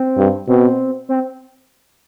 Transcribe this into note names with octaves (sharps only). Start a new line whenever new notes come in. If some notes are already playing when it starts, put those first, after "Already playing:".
Already playing: C4
G2
B2 C4
C4